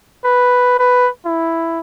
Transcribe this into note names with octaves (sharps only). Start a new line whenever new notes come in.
B4
B4
E4